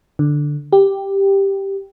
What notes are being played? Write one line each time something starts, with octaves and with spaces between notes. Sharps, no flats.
D3
G4